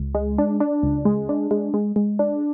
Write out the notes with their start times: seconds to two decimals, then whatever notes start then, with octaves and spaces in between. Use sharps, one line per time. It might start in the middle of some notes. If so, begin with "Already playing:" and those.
Already playing: C#2
0.15 G#3
0.38 D4
0.60 D4
0.83 C#2
1.05 G#3
1.29 D4
1.51 G#3
1.74 G#3
1.96 G#3
2.19 D4